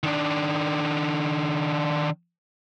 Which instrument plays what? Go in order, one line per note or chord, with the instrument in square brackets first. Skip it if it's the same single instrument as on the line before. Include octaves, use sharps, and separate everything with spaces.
[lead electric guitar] D#3 D4